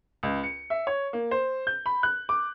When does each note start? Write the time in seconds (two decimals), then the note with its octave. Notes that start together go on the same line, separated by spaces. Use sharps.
0.23 C#2
0.44 C#7
0.70 E5
0.87 C#5
1.13 A#3
1.31 C5
1.67 G6
1.86 B5
2.03 F#6
2.29 D6